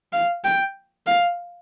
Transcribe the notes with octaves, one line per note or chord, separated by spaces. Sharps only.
F5
G5
F5